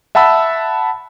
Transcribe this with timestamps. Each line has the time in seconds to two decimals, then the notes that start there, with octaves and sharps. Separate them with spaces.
0.15 E5 F#5 A5 B5 E6